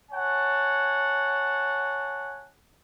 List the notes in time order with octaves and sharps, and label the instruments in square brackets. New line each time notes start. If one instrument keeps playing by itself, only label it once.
[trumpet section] C#5 F#5 G#5 A5